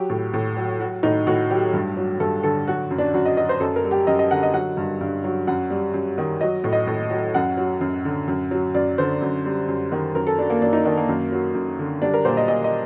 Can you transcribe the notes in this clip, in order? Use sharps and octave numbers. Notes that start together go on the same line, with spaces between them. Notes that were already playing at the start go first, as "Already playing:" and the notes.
Already playing: F#3 G4
A2
A2
F#3
F#3 F#4
A2 D#4
A2 F#4
F#3 G4
G2
F#3
G2 A4
D3 A4
F#3 F#4
F#2
D4
F#2 F#4
D#5
F#3 D#5
C5
F#2 A4
A#4
G3
G4
F#2 D#5
D#5
D3 F#5
D#5
F#3 F#5
G2
G2
F#3
F#2 F#5
G3
F#2
D#3
F#3 D#5
A2
D#5
A2
F#3
F#2 F#5
F#3
F#2
D3
F#2
F#3
F#2 D5
D3 C5
F#2
G3
F#2
D#3
F#2 A#4
A4
F#3 D4
A#3
F#2 D4
D#4
D#3 D4
A#3
F#2
F#3
F#2
D3
G3 D4
A#4
A#2 C5
D#5
A#2 D#5
D#5